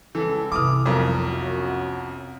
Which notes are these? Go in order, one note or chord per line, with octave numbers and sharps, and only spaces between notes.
C#2 E3 A4
C3 E3 C4 D6 D#6 F6
B1 F2 F3 A#4
F#2 F#4